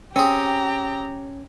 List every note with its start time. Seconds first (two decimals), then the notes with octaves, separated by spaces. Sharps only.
0.16 C4 C#4 G4 G#4 A#5